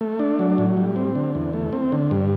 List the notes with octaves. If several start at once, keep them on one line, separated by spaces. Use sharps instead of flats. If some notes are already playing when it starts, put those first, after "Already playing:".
A3
D4
F#3
A2
G3
C4
D3
E2
A3
C4
D3
G2